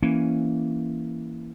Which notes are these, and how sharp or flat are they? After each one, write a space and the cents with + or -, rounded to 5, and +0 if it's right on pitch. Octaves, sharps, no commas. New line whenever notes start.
E3 +0 A#3 +0 C#4 +0